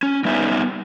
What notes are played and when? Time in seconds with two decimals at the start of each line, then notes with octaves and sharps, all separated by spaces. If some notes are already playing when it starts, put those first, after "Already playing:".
0.03 C#4
0.25 G3 B3 D#4 E5 G#5